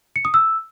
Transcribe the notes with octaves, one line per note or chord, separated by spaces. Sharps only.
C#7
D#6
E6